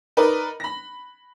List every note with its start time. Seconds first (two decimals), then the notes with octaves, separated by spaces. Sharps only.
0.17 D#4 A#4 B4 D5 D#5
0.60 B5 A#6